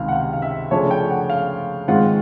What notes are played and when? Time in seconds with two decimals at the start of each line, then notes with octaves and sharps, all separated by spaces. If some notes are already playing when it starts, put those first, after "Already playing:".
Already playing: C#2 C3 D#3 F5
0.08 F#5
0.13 F5
0.33 F5
0.42 E5
0.71 C#3 F3 A3 D4 F4 C#5
0.91 G5
1.10 F#5
1.30 F5
1.88 G#2 D#3 G#3 C4 F4 F#5